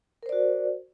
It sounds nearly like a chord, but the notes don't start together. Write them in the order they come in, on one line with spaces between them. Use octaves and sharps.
A#4 C5 D5 F#4